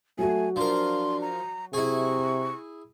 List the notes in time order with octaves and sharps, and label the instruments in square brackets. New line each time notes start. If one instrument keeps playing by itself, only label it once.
[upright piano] F#3 F#4 [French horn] A3 [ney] G#5
[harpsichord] F3 A#4 [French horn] D4 [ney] C6
[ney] A#5
[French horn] C3 [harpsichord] E4 G#4 [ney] C#6